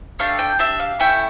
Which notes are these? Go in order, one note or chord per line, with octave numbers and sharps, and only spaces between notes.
A3 D4 G4 F5
G5
D4 G4 E5
F5
A3 C#4 E4 G5